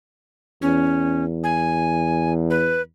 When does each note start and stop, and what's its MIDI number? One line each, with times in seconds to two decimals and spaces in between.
0.62 2.86 40
0.62 1.24 61
1.44 2.33 80
2.50 2.81 71